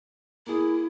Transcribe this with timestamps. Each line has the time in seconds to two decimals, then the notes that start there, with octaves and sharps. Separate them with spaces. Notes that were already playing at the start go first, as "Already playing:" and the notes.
0.47 A#3 E4 G#4